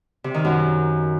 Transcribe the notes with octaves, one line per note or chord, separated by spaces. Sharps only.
C3
D#3
F#2